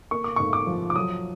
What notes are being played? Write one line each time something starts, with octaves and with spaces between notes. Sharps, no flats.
A#3 C#6
D6
G#2 C#6
D6
F3
D6
F#3 D#6